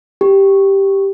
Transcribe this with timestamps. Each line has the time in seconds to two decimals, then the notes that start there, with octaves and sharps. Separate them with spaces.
0.21 G4